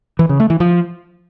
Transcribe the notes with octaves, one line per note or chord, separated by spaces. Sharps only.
E3
C#3
A3
E3
F3